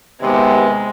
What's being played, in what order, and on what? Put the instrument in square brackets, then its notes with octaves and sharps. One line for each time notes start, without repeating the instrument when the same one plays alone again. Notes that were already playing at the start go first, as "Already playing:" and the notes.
[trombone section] D#2 C3 B3 [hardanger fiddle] G#3